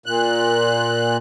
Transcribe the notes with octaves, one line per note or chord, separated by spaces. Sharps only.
A#2 F#6